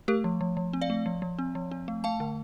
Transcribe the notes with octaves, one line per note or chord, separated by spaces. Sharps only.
A3 G4 A#4
F3
F3
F3
C4
D5 F5
A3
F3
F3
C4
F3
C4
A3
A3 F5 A5
D3